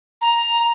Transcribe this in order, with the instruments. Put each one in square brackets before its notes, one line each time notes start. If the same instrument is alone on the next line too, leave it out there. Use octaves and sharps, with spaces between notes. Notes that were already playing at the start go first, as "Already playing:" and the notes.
[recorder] A#5